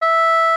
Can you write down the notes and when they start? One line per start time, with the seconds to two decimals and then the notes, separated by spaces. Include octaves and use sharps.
0.02 E5